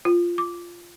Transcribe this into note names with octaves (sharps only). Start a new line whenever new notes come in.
F4
D6